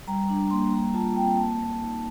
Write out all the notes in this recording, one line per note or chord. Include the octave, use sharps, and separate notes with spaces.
G3 A#5
D4
A#3 C6
G3 A#5
F4 A5
C4 G5
A#3 A5
A#3
D#4